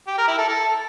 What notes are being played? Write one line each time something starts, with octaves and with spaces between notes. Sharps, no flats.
G4
A#4
E4
A4
A4